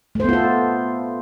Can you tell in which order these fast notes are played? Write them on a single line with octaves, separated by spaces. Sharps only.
A3 C5 B3 F4 A4